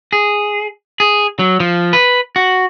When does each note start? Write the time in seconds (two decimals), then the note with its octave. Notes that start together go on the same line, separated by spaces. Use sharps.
0.13 G#4
1.00 G#4
1.39 F#3
1.60 F3
1.93 B4
2.36 F#4